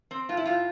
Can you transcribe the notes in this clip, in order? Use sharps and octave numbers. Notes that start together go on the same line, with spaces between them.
C4
A2 F4
E4
A2 F4